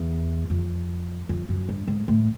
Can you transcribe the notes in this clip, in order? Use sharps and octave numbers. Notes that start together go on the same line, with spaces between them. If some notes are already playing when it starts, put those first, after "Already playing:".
Already playing: E2
F2
F2
F#2
G2
G#2
A2